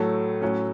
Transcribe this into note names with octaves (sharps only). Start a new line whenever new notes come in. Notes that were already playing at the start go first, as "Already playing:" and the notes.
Already playing: A2 F#3 A3 A4
A2 F#3 C#4